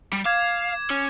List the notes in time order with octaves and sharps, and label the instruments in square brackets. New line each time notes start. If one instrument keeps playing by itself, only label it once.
[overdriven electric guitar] G3
[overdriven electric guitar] F5 [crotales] D6 G#6
[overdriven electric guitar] C#4